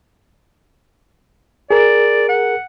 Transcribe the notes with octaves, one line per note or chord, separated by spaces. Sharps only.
G#4 A#4 D5
F#5